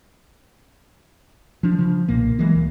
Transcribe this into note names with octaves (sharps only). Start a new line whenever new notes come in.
F3 D4
C#3 F3
B1 A#2 A#3
E3 F#3 G#3 A#3
C#2